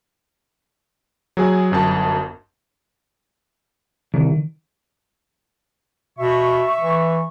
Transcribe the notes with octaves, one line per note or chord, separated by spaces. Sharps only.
F#3 G#4 G#5
G1 F#2 A5
C2 D#3
B2 E5 C#6
E3